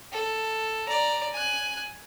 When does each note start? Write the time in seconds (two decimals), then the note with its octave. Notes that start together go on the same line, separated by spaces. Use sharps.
0.12 A4
0.87 D5 A#5
1.32 G#5 F#6